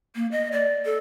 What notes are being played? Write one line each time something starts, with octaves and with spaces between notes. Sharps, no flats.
A#3
D#5
D5
A4